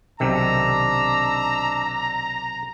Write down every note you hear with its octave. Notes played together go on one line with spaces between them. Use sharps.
B1 C3 D#3 D4 A#5 E6